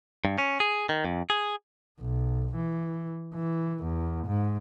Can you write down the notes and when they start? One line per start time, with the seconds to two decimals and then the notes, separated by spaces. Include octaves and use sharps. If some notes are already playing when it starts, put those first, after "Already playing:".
0.25 G2
0.38 C#4
0.60 G#4
0.89 D#3
1.05 F2
1.30 G#4
2.01 B1
2.56 E3
3.35 E3
3.84 E2
4.27 G#2